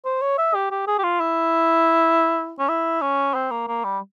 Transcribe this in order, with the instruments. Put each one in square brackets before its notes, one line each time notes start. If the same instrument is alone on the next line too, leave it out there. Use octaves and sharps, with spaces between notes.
[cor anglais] C5
C#5
E5
G4
G4
G#4
G4
F4
E4
C#4
E4
C#4
C4
A#3
A#3
G3